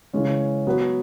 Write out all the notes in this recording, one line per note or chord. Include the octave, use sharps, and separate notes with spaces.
C#3 E3 G#3 C#4
F#3 B3 F#4 B4